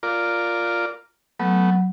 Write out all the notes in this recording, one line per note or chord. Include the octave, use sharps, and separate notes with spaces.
F4 A#4 D5
F#3 A3 B3